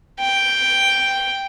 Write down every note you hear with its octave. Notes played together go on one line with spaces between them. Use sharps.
G5